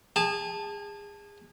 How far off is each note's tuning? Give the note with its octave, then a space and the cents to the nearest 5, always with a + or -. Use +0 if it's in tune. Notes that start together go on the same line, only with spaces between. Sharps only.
G#4 -30 A5 +0